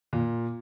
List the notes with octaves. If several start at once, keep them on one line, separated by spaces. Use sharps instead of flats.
A#2